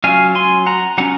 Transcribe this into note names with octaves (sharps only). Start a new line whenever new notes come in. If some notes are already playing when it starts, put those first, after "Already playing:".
F#3 C#4 F4 F5 G#5
G#5 C6
F#5 A#5
F#3 C#4 F4 F#5 A#5